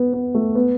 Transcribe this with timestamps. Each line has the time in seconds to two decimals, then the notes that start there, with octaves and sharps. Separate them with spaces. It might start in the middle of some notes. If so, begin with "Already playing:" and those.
Already playing: B3
0.13 B3
0.35 A3
0.55 B3